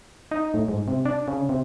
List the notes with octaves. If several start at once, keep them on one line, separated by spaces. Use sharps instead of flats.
D#4
A2
G#2
C3
D4
C#3
C3